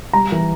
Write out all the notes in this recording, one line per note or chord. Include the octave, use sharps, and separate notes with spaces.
G3 A#5
E3